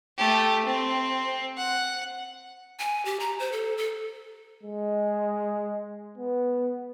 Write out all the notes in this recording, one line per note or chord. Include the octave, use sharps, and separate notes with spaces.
A3 G4
C4
F#5
G#5
G4
A#5
C5
A4
A4
G#3
B3